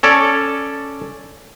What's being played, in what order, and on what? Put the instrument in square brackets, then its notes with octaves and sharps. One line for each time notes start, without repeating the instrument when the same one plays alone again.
[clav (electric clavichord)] C#4 A4 C#5 D5